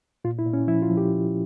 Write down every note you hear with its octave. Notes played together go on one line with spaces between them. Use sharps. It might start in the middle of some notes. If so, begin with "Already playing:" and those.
A#2 F4
E4
A#2
C#4
F3 E4
F4
F3
G4